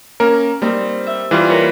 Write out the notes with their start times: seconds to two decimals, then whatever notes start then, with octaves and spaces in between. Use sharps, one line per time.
0.20 A#3 C#4 A#4
0.62 G3 A#3 C4 D#4
1.06 E5
1.31 E3 G3 F4 F5
1.50 A#4 B4 C#5